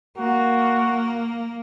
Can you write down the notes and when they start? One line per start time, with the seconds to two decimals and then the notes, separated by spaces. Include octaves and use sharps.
0.18 A#3 F#4